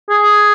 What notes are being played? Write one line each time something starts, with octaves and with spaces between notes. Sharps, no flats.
G#4